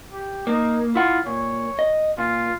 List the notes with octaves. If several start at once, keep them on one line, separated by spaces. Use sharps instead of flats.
G4
A#3 D#4
E4 F4 F#5
A#2 C#5
D#5
A#2 F4